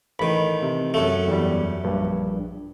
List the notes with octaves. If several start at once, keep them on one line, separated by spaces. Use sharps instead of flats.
A1 D#3 B5
C3
F#2 A3
E2 G3
A#1 G2